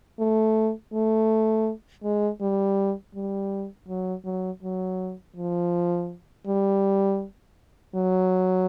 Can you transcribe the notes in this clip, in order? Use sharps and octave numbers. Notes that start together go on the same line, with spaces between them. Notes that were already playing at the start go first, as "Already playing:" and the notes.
A3
A3
G#3
G3
G3
F#3
F#3
F#3
F3
G3
F#3